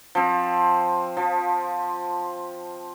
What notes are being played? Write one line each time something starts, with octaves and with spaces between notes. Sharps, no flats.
F3 C4
F3